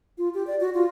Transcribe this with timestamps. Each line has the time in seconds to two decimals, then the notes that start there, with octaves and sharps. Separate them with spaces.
0.18 F4
0.34 G4
0.47 D5
0.60 F#4
0.74 F4